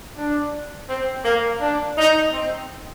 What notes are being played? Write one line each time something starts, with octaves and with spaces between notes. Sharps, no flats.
D4
C4
A#3
D4
D#4
C4